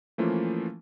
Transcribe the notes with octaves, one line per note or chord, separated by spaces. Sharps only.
E3 F3 A3 A#3 C#4 F4